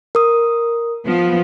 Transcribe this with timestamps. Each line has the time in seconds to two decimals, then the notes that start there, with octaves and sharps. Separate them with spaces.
0.15 A#4 D#6
1.04 F3 B3